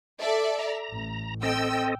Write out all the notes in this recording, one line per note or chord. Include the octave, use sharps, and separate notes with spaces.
A4 D5 E5
A#5
A1
C4 A4 D#5 G5 E6